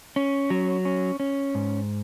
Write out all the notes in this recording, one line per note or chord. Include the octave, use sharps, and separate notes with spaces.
C#4
F#3
C#4
C#4
G#2